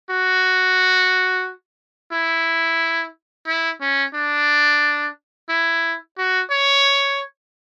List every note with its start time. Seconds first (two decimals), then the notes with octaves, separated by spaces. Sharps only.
0.10 F#4
2.12 E4
3.47 E4
3.81 C#4
4.14 D4
5.49 E4
6.18 F#4
6.51 C#5